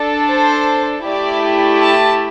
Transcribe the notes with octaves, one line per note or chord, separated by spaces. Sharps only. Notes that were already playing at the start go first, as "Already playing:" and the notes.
Already playing: D4 A4
C5
A3 E4 G4 D5
A5